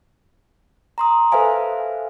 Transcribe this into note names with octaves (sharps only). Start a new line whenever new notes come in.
A#5 C6 D#6
A4 B4 C5 E5 F5 G#5